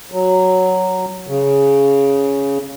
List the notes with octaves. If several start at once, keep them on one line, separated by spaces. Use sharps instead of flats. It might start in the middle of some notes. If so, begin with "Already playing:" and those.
F#3
C#3